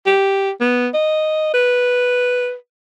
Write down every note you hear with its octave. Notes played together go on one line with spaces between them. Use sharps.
G4
B3
D#5
B4